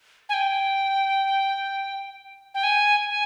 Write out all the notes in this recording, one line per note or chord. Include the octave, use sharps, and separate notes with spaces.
G#5
G5
G5
G#5
G#5